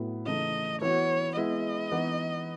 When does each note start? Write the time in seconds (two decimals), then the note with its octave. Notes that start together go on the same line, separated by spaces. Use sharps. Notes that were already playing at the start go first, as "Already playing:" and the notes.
Already playing: A2 F#3 B3 E4 A4
0.26 C#3 E3 A3 D#4 D#5
0.81 E3 B3 F#4 C#5
1.36 G#3 B3 E4 D#5
1.92 E3 B3 D#4